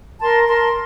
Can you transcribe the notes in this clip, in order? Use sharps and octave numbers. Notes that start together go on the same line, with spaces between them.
A#4 A5 C6
A#4 A5 C6